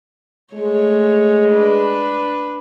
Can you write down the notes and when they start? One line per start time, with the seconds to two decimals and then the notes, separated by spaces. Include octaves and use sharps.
0.54 G#3 A3 C#5
1.51 D4 B4